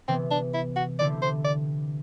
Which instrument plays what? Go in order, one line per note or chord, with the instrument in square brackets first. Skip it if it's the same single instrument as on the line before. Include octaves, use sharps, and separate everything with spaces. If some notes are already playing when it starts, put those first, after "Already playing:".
[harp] C3 E3 B3 [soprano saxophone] C4
[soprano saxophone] D4
E4
F#4
[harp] D3 A3 C4 E4 G4 [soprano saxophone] D5
[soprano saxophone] C5
D5